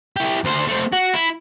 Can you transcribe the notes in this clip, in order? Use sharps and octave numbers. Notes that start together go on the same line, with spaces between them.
E4 G4
D2 C5
A3 C4
F#4
E4